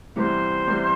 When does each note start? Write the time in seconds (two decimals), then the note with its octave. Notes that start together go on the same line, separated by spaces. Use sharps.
0.16 C3 E3 G3 B3 E4 C5
0.67 C3 E3 G3 B3 E4